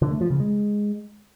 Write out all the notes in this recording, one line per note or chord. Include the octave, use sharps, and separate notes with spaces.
D3
A3
F3
C#3
G#3